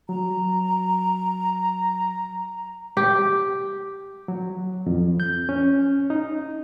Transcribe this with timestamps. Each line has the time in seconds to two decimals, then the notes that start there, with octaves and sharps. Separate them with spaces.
0.09 F#3 A#5
2.97 G4
4.28 F#3
4.86 F2
5.20 G6
5.49 C#4
6.10 D#4